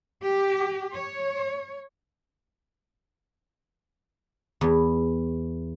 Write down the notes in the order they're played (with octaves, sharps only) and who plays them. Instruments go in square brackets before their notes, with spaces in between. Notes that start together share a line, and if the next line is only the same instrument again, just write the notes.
[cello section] G4
C#5
[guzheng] E2